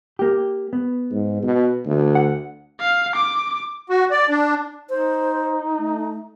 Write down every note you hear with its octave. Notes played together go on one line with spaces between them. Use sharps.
A#3 G4
B3
G#2
B2
D2
F#5
F5
D6
F#4
D5
D4
D#4 C5
A3